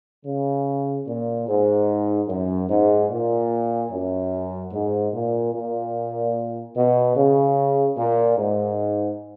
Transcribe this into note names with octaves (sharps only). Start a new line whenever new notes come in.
C#3
A#2
G#2
F#2
G#2
A#2
F#2
G#2
A#2
A#2
B2
C#3
A#2
G#2